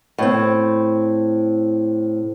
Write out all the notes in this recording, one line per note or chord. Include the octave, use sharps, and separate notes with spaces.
A2 C4